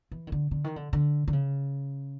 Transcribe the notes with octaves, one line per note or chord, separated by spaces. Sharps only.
E3
D#3
D3
D3
D#3
D3
D3
D3
C#3